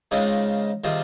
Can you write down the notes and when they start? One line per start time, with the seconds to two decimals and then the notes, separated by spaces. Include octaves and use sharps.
0.11 C#3 G#3 C4 D#4 F4 G#4
0.84 C3 D#3 G3 F4 G#4